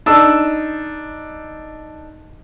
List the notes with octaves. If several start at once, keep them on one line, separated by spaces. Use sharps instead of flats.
D4 D#4 E6